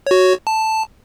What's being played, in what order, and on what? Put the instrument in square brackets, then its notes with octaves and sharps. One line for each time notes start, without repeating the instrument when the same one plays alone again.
[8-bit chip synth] F#4 C#5
A5